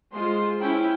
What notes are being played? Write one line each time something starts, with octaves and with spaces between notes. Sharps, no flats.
G#3 F4 C5 C6
C#4 E4 G5